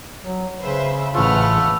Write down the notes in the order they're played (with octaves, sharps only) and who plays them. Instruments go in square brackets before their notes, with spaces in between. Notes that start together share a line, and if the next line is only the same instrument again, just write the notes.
[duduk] F#3
[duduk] C#3 [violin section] B4 C5 E5
[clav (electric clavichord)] A1 F4 [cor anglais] A3 [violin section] B4 F#5 F6